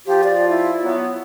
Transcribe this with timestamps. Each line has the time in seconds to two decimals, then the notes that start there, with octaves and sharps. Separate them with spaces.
0.07 F3 F4 G4
0.24 D5
0.49 E4
0.83 F#3 B3